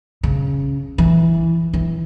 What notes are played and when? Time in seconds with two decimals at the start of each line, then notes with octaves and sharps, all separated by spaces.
0.23 C#3
0.98 E3
1.73 E3